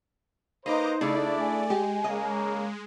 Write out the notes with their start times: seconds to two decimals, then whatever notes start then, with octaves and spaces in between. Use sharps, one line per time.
0.66 A#3 D#4 B4 C5 D#5 A#5 D6
1.01 C#3 A3 D4 E4 D5
1.39 G#5
1.70 G#3 G4
2.04 C#3 A#3 D#5